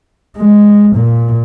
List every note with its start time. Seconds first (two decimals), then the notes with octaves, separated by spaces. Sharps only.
0.37 G#3
0.97 A#2